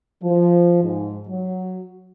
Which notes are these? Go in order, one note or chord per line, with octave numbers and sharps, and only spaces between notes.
F3
G#2
F#3